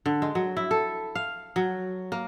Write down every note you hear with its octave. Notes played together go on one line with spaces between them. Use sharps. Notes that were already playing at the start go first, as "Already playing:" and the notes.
D3
G#3
F#3
E4
A4
F5
F#3
A#3